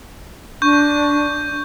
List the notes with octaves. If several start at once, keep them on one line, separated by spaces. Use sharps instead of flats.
D4 C#6 G6